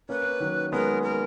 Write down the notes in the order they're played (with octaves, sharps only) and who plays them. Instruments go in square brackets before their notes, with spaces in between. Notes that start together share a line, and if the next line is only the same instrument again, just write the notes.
[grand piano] A#3 C#4 [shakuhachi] B4
[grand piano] D#3 F#3
[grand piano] G#3 B3 [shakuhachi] A#4
[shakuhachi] A#4